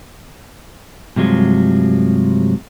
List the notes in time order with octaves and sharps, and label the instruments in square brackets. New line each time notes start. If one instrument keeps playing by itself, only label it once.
[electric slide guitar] G2 C3 F3 F#3 G#3